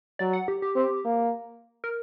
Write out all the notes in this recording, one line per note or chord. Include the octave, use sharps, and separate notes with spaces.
F#3 D5
F#5
G4
G4
C4
A#3
A#4